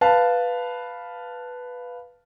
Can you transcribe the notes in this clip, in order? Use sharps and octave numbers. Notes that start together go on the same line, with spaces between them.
B4 F5 A5